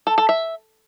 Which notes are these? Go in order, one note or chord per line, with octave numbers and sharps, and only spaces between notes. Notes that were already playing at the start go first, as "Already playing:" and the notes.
A4
A4
E5